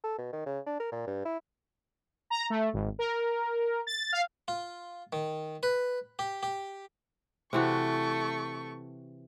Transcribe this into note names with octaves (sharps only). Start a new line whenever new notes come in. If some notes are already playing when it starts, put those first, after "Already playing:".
A4
B2
D#3
C#3
D4
A#4
A#2
G2
E4
A#5
A3
G#1
A#4
A6
F5
F4
D#3
B4
G4
G4
C3 E3 A3 F#4 C#6